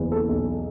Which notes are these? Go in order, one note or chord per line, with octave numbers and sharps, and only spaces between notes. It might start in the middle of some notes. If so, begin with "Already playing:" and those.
Already playing: F#1 E2
A4
B1